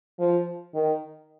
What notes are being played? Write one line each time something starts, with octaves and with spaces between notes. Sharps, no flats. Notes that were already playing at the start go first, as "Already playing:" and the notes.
F3
D#3